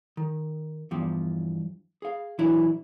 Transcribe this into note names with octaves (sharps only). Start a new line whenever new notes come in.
D#3
E2 G2 F3 G4
G#4 F5
A#2 E3 F#3 D4 E4